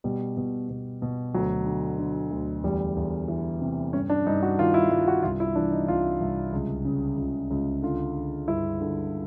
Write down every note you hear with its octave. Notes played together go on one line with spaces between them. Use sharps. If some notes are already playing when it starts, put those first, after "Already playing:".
B2 G3
B2
B2
B2
D2 F#3
D3
D3
D2
E2 G3
E2
E3
C3
G2 C#4
D4
G2 D#4
F#4
D#3 F4
E4
G2 F4
F#4
C2 F4
E4
E3 D4
D#4
C2 F4
C2
C#2
C#3
C#2
C#2
D3 F4
D3
G2 E4
D3